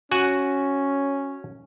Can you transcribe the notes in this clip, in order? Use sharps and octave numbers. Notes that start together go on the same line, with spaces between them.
C#4 F#4 F#5 G#5